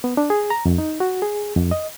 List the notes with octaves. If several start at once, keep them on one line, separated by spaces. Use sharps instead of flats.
B3
D4
G#4
A#5
F2
D#4
F#4
G#4
F2
D#5